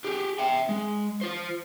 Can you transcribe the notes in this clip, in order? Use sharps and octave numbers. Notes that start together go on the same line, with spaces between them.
G4 G#4
E5 G5
G#3
F4 C5